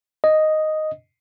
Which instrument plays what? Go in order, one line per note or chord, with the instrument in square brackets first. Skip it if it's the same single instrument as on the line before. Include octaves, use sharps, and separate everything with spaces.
[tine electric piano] D#5